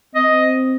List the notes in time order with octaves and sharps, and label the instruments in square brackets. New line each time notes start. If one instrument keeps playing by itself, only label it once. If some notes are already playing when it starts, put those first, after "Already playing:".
[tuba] C4 [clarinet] D#5